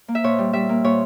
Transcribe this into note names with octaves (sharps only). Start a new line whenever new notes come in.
A#3
E5
A#2 C#5
G3
G3 E5
A#3
A#2 C#5